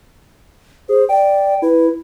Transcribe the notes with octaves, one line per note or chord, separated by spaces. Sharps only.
G#4 C5
D5 G5
E4 B4